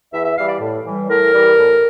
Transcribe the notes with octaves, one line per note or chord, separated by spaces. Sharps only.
E2 E5
E5
E3 G3 F5
D5
A2
E3 G3
A2 A#4
E3 G3
A2